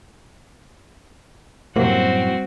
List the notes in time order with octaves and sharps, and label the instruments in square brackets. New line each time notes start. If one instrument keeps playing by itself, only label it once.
[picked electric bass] F#2 A2 [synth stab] C3 A#3 [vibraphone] G3 F#5 [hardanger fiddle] C4 F#4